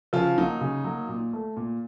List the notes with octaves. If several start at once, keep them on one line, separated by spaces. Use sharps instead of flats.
C#3 F3 F4
F#3 A#3 D#4
C#3
F#3 A#3
A#2
A3
A#2